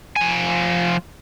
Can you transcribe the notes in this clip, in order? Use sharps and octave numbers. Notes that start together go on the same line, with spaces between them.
F3 G#5